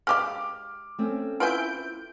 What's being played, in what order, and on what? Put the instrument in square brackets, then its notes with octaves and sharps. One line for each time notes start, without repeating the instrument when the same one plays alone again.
[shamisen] G#3 G4 F5 [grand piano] D6 F6
[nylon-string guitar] A3 C4 C#4
[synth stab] E4 G6 D7 [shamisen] F4 B4 G#5